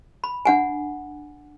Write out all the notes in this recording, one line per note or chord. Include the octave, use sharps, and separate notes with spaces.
B5
D4 F#5 G#5